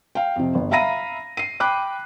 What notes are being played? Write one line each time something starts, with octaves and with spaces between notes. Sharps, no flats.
F5 G5
F2 C3
G1
E5 F5 A#5 B5 A#6 D#7
C7 D#7
G5 B5 D6 F#6